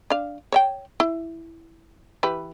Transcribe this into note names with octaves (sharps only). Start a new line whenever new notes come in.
D4 F5
C#5 E5 G5
E4
E3 G4 B4